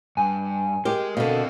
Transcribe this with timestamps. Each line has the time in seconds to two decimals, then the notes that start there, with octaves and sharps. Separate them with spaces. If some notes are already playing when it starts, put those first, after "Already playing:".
0.17 G2 G#5
0.85 G#3 G4 G#4 A#4
1.17 B2 D3 C4 A4 F5